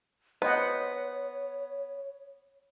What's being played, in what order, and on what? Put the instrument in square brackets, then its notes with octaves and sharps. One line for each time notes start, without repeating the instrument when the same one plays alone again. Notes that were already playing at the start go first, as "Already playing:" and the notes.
[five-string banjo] B3 [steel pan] C5 D#5 F#5 [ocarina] C#5